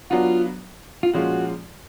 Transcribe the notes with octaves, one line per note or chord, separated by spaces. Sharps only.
F#3 B3 D4 F4 F#4
F4
A#2 F3 G#3 C#4 F4 F#4